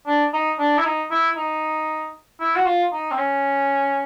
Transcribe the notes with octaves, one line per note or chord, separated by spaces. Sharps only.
D4
D#4
D4
E4
D#4
E4
D#4
E4
F#4
F4
D#4
C4
C#4